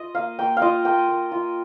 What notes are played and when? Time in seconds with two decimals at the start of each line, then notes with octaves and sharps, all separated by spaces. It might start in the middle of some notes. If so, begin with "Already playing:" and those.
Already playing: F4 D#5
0.15 A#3 F5
0.39 A#3 G5
0.57 F5
0.62 F4 D#5
0.85 A#3 G5
1.08 A#3
1.32 F4